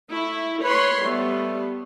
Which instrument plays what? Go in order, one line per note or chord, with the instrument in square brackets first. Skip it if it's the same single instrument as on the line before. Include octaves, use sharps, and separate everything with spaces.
[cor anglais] A3 [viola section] E4
[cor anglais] B4 [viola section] C#5 B5 C6
[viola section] G3 B3 [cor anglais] A3